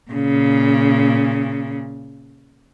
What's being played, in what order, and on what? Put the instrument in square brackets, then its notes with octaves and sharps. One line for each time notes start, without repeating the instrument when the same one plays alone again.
[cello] A#2 C#3